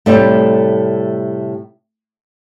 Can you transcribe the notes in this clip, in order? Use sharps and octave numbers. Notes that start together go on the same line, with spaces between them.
A2 C3 G3 A3